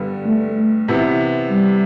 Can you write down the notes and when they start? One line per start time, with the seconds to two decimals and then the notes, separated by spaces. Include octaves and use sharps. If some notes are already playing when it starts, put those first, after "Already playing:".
Already playing: G2 D3 G3 B3
0.26 A3
0.88 C3 E3 B3
1.50 G3